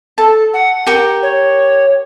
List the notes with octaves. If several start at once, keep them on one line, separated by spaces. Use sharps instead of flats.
A4 A5
F#5
G4 A#4
C#5